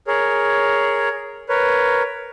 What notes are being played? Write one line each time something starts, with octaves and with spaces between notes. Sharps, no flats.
G#4 A#4 C#5
A#4 B4 C#5